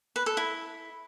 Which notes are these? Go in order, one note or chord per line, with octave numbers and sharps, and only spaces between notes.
B4
A4
E4